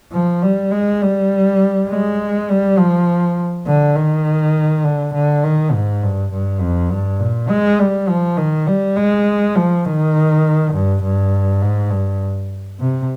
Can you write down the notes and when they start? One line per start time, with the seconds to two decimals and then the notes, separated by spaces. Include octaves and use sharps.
0.12 F3
0.42 G3
0.71 G#3
1.02 G3
1.89 G#3
2.49 G3
2.78 F3
3.66 D3
3.95 D#3
4.84 D3
5.14 D3
5.44 D#3
5.72 G#2
6.02 G2
6.32 G2
6.61 F2
6.91 G2
7.19 A#2
7.49 G#3
7.79 G3
8.09 F3
8.37 D#3
8.67 G3
8.97 G#3
9.55 F3
9.85 D#3
10.73 G2
11.03 G2
11.61 G#2
11.91 G2
12.79 C3